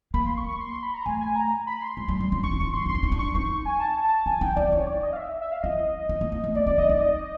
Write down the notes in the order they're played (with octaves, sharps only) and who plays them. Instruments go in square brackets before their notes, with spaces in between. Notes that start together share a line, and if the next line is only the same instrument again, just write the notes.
[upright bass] A#3 [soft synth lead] B5
[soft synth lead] C6
C#6
C#6
C6
C6
B5
A#5
[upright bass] A3 [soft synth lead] G#5
[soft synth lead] G#5
A#5
B5
C6
[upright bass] G#3
G3
G3
C#4
[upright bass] D4 [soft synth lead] C#6
[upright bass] D#4
[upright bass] D4 [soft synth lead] C#6
[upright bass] D#4
[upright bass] D4 [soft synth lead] C6
[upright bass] D#4 [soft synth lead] C6
[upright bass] D4
[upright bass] D#4 [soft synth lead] C#6
[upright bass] D4
[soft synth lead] C#6
[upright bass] D#4 [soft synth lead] C#6
[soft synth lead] G#5
A5
A5
[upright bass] E4 [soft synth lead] G#5
[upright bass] D#4 [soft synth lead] G5
[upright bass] E4 [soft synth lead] D5
[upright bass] D#4 [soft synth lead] C#5
[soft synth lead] D5
D#5
F5
E5
E5
F5
[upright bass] E4 [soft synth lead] D#5
[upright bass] D#4
A#3
A3
A3
[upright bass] B3 [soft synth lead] D5
[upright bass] C#4 [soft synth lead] D5
[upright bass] D4 [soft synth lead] D#5
[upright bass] D#4 [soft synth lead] D5
[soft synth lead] D#5